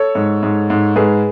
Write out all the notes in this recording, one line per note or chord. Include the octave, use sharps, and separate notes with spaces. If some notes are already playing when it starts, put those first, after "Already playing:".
Already playing: A4 C#5
G#2
G#2
G#2
G#2 G#4 B4